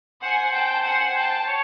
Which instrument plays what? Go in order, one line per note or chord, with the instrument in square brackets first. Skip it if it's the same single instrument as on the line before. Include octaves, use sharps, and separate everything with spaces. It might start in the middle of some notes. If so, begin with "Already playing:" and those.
[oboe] C5 [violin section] F#5 G#5
[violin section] G5 A5
F#5 G#5
G5 A5
[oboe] C#5